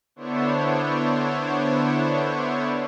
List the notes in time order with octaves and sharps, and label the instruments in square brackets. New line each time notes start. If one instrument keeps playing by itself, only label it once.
[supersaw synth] D3 B3 D4 E4 C5 C#5